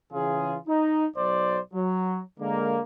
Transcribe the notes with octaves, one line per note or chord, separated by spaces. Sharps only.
C#3 E3 F4 G#4
D#4
B1 F#3 C5 D5
F#3
D3 G#3 A#3